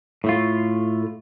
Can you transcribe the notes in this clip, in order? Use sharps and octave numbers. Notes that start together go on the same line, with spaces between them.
A2 A3 F4